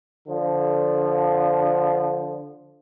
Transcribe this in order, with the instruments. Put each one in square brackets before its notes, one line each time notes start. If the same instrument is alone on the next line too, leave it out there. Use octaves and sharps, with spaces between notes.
[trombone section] D3 F3